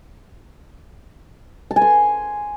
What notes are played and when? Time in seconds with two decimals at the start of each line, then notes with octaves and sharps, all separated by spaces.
1.71 A5
1.76 G#5
1.82 C6